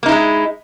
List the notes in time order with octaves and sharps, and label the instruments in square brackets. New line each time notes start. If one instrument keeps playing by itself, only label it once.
[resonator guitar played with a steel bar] A#3
D#4
E4
G#3